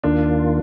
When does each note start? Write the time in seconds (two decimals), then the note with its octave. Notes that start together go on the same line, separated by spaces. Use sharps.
0.04 D#2 D#3 A#3 D4 F4